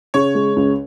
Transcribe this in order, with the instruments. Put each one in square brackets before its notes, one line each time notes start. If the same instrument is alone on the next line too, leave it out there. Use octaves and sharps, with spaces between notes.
[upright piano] C#3 [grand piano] C#5
[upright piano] G#3
C#2